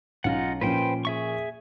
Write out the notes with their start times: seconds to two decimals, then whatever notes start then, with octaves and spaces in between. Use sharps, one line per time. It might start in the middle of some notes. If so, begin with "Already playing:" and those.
0.24 B1 C#4 D#4 F4 F5 F#5
0.61 A#2 F3 C#4 B4 C5 G5
1.05 G#4 E5 C#6